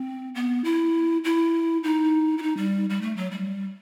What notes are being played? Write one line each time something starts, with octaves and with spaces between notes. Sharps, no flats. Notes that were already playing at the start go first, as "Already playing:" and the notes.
Already playing: C4
B3
E4
E4
D#4
E4
D#4
G3
G3
A3
F#3
G3